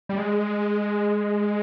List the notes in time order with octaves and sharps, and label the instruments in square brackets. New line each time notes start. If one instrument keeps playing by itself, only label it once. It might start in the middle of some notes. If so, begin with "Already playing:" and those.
[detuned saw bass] G3
G#3